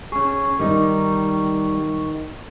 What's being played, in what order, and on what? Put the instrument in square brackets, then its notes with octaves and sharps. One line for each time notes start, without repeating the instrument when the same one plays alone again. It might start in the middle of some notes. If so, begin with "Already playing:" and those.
[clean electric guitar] C#4 G#4 [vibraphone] C#6
[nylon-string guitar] D#3 D#4 [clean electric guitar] G3